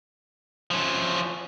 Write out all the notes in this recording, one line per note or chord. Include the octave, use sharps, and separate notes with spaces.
F3 C#4